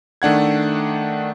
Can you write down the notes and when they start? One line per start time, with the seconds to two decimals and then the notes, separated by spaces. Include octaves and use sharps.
0.22 D#3 A3 D4 F#5 G#6